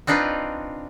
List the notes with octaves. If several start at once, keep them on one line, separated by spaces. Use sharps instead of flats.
C4 D4 D#4 F4 B4